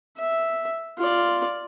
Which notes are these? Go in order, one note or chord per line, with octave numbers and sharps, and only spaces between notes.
E5
F4 D5